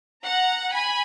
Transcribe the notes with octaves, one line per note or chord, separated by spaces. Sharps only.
F#5 A#5
G#5 B5